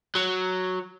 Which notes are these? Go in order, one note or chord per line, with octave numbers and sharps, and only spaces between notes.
F#3